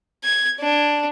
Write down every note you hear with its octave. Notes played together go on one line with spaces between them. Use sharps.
G#6
D4